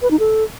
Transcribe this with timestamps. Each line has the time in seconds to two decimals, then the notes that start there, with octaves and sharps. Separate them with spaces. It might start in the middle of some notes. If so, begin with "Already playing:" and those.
0.02 B4
0.11 D#4
0.19 A4